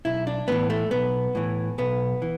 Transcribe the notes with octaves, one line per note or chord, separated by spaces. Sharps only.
B1 E4
D4
A2 E3 B3
A3
B1 B3
A2 E3
B1 B3
E3